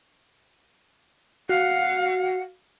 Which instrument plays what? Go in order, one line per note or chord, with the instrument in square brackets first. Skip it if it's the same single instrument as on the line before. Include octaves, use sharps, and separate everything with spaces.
[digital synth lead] F#4 [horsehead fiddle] F5 [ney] F#5